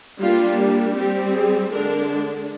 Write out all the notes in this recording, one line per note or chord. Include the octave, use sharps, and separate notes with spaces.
G3 A#3 D4 F4
G3 C4 G4
G#4
D3 G#3 D4 A#4